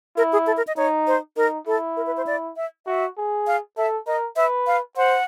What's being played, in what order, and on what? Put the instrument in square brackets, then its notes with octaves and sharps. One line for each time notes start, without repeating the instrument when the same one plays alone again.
[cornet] E4 [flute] A#4
[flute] G#4
A4
A#4
D#5
[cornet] D#4 [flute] C#5
[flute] C5
[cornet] D#4 [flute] A#4
[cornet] E4 [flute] A4
[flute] A#4
B4
C5
D5
E5
[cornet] F#4 [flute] E5
[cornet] G#4
[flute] F5
[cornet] A4 [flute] E5
[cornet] A#4 [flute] D#5
[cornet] B4 [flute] E5
[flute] F5
[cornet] C5 [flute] F#5